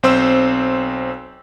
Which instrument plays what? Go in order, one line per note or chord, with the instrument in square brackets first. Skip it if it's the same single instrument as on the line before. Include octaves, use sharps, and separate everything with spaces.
[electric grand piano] B1 C4 C5 E6